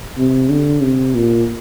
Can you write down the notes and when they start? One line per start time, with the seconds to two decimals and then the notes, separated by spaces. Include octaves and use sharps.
0.18 C3
0.49 D3
0.82 C3
1.15 A#2